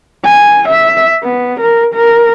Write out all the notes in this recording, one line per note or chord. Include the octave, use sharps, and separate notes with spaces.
G#5
E5
B3
A#4
A#4